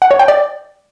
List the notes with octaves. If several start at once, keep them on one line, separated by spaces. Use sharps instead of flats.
F#5
C#5
G5
D5